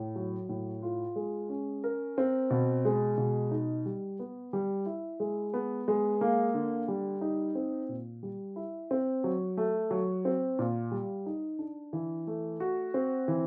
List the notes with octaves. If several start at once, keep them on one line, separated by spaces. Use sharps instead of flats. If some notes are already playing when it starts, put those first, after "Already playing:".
Already playing: A2
F#3
A2
F4
G#3
C#4
A#4
C4
B2
G#3
B2
D#4
G3
B3
G3
E4
G#3
B3
G#3
A#3
D3
G3
D#4
C4
A#2
G3
E4
C4
F#3
A3
F#3
C4
A#2
G3
D#4
D4
E3
A3
F#4
C4
E3